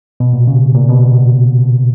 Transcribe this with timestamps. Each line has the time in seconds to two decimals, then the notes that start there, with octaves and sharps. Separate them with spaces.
0.20 B2
0.34 A#2
0.47 C#3
0.75 A#2
0.89 B2